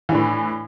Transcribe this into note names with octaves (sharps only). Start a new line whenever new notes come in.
A2 E3 D4